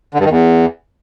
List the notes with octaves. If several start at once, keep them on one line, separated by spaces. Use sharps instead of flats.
D3
G2
D#3
E2